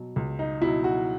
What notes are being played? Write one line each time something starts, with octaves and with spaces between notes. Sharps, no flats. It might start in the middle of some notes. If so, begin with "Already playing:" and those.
Already playing: B2 F#3
C#2
D#4
B2 F#3 E4
F#4